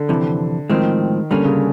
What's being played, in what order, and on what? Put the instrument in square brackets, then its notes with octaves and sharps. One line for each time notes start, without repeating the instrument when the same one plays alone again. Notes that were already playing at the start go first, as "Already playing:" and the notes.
Already playing: [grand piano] D3
[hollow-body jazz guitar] F2 C3 E3
[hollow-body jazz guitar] A2 F3 G#3 C4 [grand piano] D#3
[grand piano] D3 [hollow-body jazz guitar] G3 A#3 C#4
[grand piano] C#3